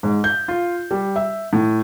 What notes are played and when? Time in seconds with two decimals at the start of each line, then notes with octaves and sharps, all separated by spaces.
0.03 G#2
0.24 G6
0.48 F4
0.91 G3
1.16 E5
1.53 A2